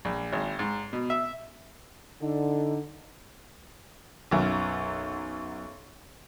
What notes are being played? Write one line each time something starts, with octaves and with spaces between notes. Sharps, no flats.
A#1
G#1
G#2
B2
E5
D3 D#4
B1 F#2